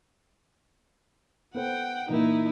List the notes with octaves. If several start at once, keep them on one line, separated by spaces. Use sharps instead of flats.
B3 A4 C5 F#5 G5
A#2 E3 A#3 D#4 E4